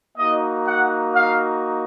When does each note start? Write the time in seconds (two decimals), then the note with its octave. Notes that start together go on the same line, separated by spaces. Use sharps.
0.17 A#3 D#4 F#4 D#5
0.66 F#5
1.14 F5